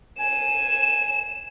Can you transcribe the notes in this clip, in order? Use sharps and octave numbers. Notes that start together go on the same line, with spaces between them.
G#5 E7